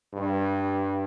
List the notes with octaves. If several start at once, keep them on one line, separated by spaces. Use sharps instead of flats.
G2